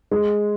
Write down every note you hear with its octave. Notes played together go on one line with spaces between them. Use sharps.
G#3